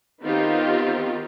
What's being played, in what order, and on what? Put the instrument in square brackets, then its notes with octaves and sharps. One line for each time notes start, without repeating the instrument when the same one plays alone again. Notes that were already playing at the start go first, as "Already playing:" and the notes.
[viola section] D#3 B3 C4 D#4 F4 G4